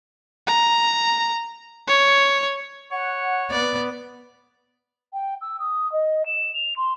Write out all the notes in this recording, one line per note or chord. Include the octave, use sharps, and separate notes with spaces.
A#5
C#5
C#5 F#5
B3 D5
G5
E6
D#6
D#5
E7
F7
C6